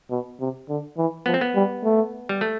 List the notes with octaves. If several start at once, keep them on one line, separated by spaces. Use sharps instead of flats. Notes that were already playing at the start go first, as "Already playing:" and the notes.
B2
C3
D3
E3
F3 B3
C4
B3
G3
A3
G3
A3